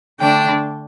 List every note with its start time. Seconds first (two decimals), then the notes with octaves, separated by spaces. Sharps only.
0.19 D3 A3 D4 G5